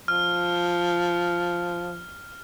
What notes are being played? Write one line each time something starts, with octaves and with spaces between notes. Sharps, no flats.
F3 F6